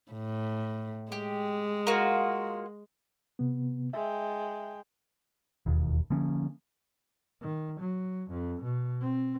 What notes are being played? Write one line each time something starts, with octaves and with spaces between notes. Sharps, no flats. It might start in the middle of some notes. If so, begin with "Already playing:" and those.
A2
G#3 G4
A#3 F4 F#4
C3 B3
G#3 E5 G5
E1 D#2
D3 F3 A#3 C#4
D#3
F#3
F2
B2
C4